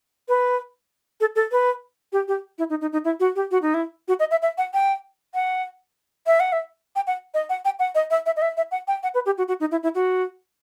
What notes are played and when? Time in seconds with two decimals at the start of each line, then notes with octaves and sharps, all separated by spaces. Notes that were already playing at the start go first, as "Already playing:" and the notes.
0.29 B4
1.21 A4
1.36 A4
1.52 B4
2.13 G4
2.28 G4
2.59 E4
2.70 D#4
2.81 D#4
2.92 D#4
3.05 E4
3.20 F#4
3.36 G4
3.51 F#4
3.62 D#4
3.74 E4
4.08 F#4
4.20 D#5
4.31 E5
4.42 E5
4.58 F#5
4.74 G5
5.35 F#5
6.27 E5
6.40 F#5
6.53 E5
6.96 G5
7.07 F#5
7.34 D#5
7.50 F#5
7.65 G5
7.79 F#5
7.95 D#5
8.11 E5
8.26 E5
8.37 D#5
8.42 E5
8.57 E5
8.71 F#5
8.88 G5
9.03 F#5
9.14 B4
9.26 G4
9.38 F#4
9.48 F#4
9.60 D#4
9.72 E4
9.83 E4
9.95 F#4